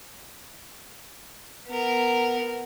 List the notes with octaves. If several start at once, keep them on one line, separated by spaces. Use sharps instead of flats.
B3 A#4